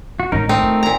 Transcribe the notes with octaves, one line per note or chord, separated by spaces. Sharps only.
F#4
A1 G#3 C#4 D#4 A#4
A3 C4 D#4 A#4
F4
A#2 A#5